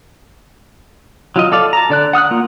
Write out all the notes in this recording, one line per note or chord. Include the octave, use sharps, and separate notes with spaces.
F#3 F4 D#5
A4 D5 F5
A5 A#5
D3 D5 F#6
F#5 D#6 F6 F#6
A#3 F4